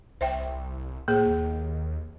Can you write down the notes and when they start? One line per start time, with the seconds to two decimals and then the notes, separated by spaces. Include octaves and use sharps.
0.21 C2 C5 E5 G5
1.08 A2 A#3 G#4
1.26 D#2